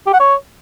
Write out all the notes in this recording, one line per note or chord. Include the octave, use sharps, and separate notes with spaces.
G4
F#5
C#5